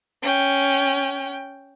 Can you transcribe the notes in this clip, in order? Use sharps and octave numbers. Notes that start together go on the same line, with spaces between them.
C#4 G5